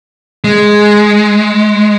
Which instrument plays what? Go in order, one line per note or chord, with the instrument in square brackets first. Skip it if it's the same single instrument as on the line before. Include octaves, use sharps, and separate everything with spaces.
[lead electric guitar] G#3